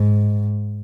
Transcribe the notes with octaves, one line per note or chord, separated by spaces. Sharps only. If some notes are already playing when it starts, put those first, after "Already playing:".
Already playing: G#2